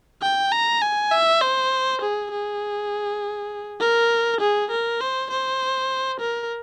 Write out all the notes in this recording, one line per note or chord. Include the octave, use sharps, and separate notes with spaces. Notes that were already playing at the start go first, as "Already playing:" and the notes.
G5
A#5
G#5
E5
C5
G#4
G#4
A#4
G#4
A#4
C5
C5
A#4